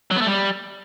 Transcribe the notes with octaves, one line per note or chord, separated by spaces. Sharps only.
F#3
B3
A3
G3